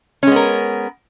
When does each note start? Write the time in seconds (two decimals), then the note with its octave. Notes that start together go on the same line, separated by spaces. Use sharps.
0.23 C#4
0.27 G#3
0.32 B3
0.36 A#4